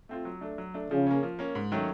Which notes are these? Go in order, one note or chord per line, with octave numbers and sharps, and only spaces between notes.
A3 C4 F4
F#3
A3 D4
F#3
A3 D4
C#3 F3
A#3 C#4
F3
A#3 C#4
G#2
D#3 F#3 A3 C#4